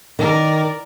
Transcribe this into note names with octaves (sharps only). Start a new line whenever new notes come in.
D#3 A#4 D5